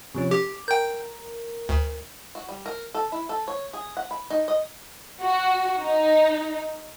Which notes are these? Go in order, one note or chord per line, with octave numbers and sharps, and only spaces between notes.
C3 F3 C#4
G4 D6
A#4 G5 G6
D2
F#4
G3
A#4
A4
E4
A4
C#5
G#4
F#5
B5
D#4
D#5
F#4
D#4